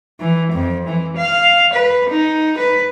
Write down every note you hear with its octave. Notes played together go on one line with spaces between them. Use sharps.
E3
F2
E3
F5
B4
D#4
B4